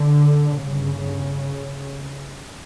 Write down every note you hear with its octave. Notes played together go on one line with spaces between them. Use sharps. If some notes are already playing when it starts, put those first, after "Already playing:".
Already playing: D3
G1 G2 C#3